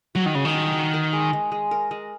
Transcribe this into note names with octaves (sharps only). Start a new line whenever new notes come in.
F#3 F#4
D#3
C#3 G#3
D#3
F#4
F#4
A#4
G#3
G#3
G#3
A#4
G#3